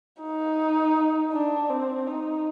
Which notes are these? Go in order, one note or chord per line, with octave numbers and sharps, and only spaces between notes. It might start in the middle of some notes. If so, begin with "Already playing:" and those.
D#4
D4
C4
D#4